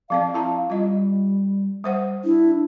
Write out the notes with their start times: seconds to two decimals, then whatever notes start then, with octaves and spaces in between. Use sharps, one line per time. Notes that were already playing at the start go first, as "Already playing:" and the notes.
0.10 F3 C4 D5 F5
0.34 E4 A5 A#5
0.70 G3 F4 D#5
1.84 G3 C5 F#5
2.25 D4 E4